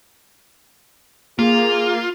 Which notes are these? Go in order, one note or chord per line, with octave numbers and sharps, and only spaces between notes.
A#3 F4 G#4